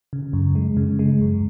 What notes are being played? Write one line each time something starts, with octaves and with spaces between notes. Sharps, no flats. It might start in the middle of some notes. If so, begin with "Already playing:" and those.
C#3
F#2
G#3
C#3
G#3
F#2